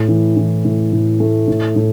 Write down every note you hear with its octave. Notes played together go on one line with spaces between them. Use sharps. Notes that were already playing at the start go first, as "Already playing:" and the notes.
Already playing: A2
E3
E3
A2
A2
A3
A2
A2